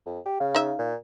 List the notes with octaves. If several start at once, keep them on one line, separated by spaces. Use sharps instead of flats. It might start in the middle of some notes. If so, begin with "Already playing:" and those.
F2
G4
C#3 F5
D#4 E5
A#2